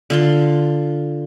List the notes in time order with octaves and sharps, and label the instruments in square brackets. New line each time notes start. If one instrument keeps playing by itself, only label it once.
[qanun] D3 F4 C6